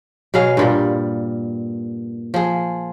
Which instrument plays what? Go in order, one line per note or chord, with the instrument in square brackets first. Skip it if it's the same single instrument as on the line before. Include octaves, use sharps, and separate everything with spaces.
[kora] B2 F#3 G#4 F5
G2 A#2 G3
F3 G#4